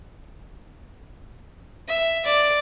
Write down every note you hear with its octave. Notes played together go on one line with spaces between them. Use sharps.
E5
D5